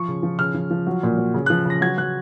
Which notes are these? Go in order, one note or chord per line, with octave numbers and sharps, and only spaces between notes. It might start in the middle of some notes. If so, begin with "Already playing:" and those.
Already playing: F3 C#6
C#3
F3
C#3 F6
F3
F3
F#3
A#2
F#3
C#3
F#6
F3
C#3 A#6
F#3 G#6
F#3 F#6